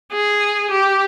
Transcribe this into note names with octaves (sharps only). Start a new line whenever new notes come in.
G#4
G4